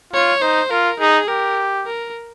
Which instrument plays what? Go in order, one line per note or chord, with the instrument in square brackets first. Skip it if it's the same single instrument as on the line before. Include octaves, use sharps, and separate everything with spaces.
[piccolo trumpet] F4 [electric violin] C#5
[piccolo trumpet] D#4 [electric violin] C5
[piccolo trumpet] F4 [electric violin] A#4
[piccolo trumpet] D#4 [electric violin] G#4
[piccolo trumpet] G4 [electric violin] A#4
[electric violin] A#4